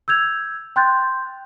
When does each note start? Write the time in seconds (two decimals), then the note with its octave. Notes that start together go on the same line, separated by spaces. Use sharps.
0.08 E6 G6 G#6 F7
0.76 G5 C6 F#6 G6 A6